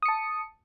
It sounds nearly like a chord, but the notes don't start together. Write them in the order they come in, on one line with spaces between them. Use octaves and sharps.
D#6 C#7 A5